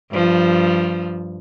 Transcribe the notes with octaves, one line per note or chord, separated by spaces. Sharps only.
G2 F3